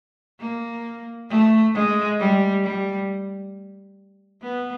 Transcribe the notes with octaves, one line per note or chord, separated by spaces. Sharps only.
A#3
A3
G#3
G3
G3
B3